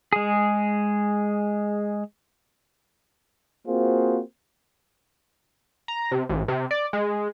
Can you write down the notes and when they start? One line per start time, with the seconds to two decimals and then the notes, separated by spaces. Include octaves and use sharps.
0.13 G#3 G#4
3.67 A#3 C4 F4 F#4 G#4 C5
5.88 A#5
6.11 C3
6.29 A1
6.48 C3
6.71 D5
6.93 G#3